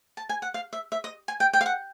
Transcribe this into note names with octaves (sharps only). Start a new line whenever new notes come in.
A5
G#5
F#5
F5
E5
E5
D#5
G#5
G5
G5
F5
F#5